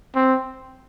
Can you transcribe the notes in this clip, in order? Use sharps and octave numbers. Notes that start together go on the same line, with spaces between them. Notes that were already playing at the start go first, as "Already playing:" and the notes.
C4